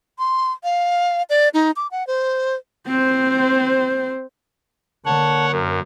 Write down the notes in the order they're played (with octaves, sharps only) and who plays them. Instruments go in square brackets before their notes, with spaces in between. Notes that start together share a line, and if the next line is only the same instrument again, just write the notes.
[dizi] C6
F5
D5
D#4
D6
F#5
C5
[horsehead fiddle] C4 C5
[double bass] D3 A#3 [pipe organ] C#5 F#5 [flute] A5
[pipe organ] F#2 [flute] A#4